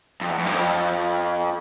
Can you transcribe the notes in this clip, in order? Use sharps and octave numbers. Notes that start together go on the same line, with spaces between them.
F2
E2
F2
G2
F2